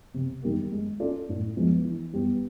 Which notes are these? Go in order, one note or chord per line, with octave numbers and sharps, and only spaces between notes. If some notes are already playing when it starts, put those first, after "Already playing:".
C3
D#3 G3 A#3
G#3
C#4 F4 A4 D5
A2
F3 G#3 B3
E3
G3 B3